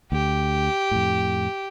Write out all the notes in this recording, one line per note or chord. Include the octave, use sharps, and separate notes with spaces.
D2 G4
F2 A2